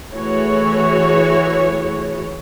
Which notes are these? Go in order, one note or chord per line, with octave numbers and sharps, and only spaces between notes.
E3 A3 F#4 G#4 C#5